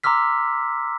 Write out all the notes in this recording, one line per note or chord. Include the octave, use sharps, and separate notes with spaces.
A#5 C6 D6 E6 F6 B6